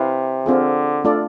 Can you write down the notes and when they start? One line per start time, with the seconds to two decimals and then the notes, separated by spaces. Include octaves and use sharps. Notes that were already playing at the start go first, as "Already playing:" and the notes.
Already playing: C3 E4 B4 F5
0.46 D3 C4 F4 G#4
1.04 A3 D4 F4 A4 D5